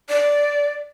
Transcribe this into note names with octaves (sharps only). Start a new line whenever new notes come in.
D5